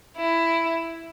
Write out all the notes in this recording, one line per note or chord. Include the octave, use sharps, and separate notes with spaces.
E4